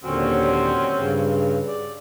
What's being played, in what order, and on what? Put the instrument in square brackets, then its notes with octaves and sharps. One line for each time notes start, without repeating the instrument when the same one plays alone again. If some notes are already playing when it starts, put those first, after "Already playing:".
[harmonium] D#2 A#2 D3 [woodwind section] F#3 C4 C#4
[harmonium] G2 C#3
D5